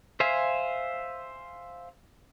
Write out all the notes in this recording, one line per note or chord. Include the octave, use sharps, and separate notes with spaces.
C5 E5 F5 G#5